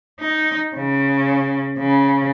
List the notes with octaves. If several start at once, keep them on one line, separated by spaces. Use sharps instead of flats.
D#4
C#3
C#3